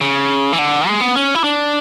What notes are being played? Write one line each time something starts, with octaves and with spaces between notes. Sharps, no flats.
C#3
E3
D3
G#3
B3
C#4
E4
D4